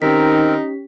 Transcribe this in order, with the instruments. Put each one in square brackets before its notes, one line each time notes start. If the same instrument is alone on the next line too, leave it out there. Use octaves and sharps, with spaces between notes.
[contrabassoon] D#3 [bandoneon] C4 A#4 [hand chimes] C#4 G4 B6 [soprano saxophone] D#4